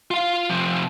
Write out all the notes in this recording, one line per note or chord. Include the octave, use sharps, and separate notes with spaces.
F4 F5
C3 F3